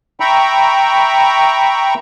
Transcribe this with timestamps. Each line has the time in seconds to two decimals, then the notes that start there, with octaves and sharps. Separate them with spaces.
0.20 E5 G5 A#5 B5 C#6